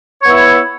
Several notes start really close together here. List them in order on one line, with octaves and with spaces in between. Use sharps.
C#5 B3 E4